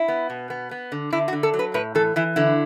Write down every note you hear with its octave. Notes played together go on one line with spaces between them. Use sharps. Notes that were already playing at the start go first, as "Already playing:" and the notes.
Already playing: E4
B3
B2
B3
B3
D3
D3 E4
F#4
D3
A4
F#3
B4
A2 B4
E3 A4
E3 E4
D3 E4